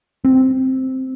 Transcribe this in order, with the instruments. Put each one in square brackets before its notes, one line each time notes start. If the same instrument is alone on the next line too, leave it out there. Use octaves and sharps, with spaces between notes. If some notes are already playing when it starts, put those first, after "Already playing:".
[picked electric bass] C4